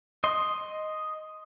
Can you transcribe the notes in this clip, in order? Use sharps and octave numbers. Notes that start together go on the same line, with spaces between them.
D#5 C6